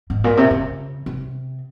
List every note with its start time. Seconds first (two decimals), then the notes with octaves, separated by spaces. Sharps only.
0.10 G#2
0.24 A#2
0.37 C3
0.51 C#3
1.06 C3